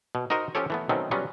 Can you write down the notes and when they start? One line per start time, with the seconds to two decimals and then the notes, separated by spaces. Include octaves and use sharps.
0.15 B2
0.30 D#4 F#4 A#4 C5 D#5
0.55 F3 C#4 F4 G4 A4 C#5
0.70 E3 A3 B3
0.89 B2 D#3 F#3 A3 C4 C#4
1.11 F#3 G3 B3 C#4 F4